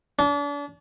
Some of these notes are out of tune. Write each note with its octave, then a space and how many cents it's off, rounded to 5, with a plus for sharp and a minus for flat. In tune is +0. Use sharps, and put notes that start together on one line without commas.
D4 -35